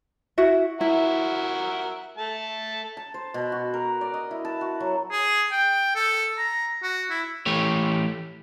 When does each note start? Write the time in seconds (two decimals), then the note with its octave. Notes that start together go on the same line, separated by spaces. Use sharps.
0.38 E4 F#4 E5
0.81 E4 F#4 A#4 E5
2.17 A3 A5
2.97 A5
3.14 C5
3.34 B2
3.52 F#4
3.74 A#4
4.01 D5
4.14 D#5
4.31 E4
4.45 A5
4.61 F#4
4.80 F#3
5.11 G#4
5.51 G5
5.95 A4
6.38 A#5
6.82 F#4
7.10 E4
7.46 E3 A3 G4 C#5